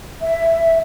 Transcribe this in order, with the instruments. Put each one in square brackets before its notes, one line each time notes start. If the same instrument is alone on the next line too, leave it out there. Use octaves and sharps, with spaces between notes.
[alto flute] E5